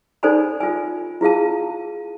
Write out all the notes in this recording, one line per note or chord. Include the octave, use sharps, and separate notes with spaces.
D#4 A4 C5 D5 G#5 B5
F4 G#5
E4 F4 G#4 F5 A5